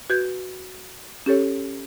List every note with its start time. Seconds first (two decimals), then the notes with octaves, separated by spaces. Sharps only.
0.10 F#4 B4 G6 G#6
1.26 C#4 G4 A4 C#5